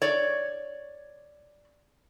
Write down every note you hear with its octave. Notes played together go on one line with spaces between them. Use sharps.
C#5 D5